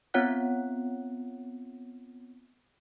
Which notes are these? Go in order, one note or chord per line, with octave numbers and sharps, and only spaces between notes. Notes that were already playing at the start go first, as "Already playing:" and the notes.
B3 C4 F4 C#5 F#5 F#6